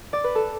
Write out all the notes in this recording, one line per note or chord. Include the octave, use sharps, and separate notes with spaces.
D5
B4
A4